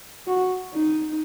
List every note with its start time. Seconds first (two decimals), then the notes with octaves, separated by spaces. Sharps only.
0.27 F#4
0.74 D#4